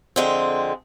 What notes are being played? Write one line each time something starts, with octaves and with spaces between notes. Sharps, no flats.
F2 D3 G#3 C4